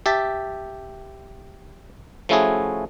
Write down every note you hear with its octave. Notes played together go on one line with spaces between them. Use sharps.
G4 E5 A5
F3 A3 C#4 E4 F#4 G#4